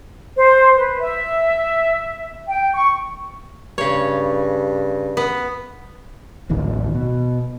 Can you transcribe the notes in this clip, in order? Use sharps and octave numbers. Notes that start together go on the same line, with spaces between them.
C5
B4
E5
G5
C#6
G2 C#3 C#5
B3
D1 A1 D#3
B2